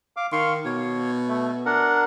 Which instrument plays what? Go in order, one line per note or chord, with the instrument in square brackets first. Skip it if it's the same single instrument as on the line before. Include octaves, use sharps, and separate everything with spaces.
[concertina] F5 D6
[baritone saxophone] D#3 [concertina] F5 C6 C#6
[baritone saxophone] B2 [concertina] C#5
[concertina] A3
D4 A#4 F#5